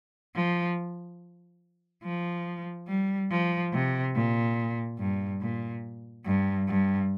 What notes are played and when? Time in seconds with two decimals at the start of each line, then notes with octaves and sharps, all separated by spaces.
0.35 F3
2.03 F3
2.88 G3
3.31 F3
3.73 C3
4.15 A#2
4.99 G2
5.42 A#2
6.26 G2
6.68 G2